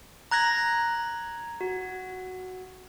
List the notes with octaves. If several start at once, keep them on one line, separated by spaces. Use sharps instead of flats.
A#5 F#6 G#6 A#6
F#4